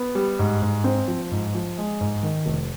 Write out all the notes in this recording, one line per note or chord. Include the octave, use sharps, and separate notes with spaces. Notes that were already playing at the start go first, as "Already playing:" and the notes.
Already playing: B3
G3
G#2
G#2
C4
F3
G#2
F3
G#3
G#2
D#3
F1